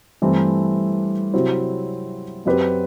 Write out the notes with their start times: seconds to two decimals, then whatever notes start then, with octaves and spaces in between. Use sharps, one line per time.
0.22 G2 E3 A3 C4 E4
1.34 C3 F#3 C4 E4
2.45 F#2 F#3 C4 G4 B4